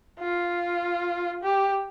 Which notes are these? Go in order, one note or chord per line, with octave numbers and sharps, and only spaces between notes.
F4
G4